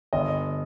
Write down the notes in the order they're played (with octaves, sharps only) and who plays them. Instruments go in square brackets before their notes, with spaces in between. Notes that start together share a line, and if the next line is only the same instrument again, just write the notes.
[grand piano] G1 D#5